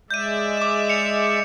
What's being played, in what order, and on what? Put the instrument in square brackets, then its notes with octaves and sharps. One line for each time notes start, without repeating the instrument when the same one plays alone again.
[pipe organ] G#3 D5 E5 [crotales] G6 D#7
[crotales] D6 E7
C#7 F7